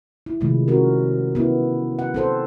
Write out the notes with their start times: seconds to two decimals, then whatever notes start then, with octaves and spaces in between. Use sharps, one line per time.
0.26 E4
0.41 C3 D#3 F3 G#3 A3
0.68 C#4 F#4 A#4
1.35 B3 E4
1.99 F#5
2.14 C4 A4 C5